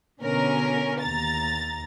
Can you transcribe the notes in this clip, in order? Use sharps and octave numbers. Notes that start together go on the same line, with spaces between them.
B2 D3 C#4 A#4
D#2 A#5 A6